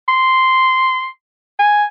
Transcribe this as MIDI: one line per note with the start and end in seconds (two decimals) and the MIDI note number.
0.08 1.06 84
1.59 1.84 80